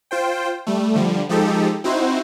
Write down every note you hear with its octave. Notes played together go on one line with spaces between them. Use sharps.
F4 C5 G5
G3 A3
D3 F3 G3
F3 G#3 D#4 G4 A4
C4 D#4 E4 F#4 C5